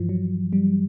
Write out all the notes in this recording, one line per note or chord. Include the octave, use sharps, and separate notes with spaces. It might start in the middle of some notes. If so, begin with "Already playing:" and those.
Already playing: G2 E3 F3
F#3
G3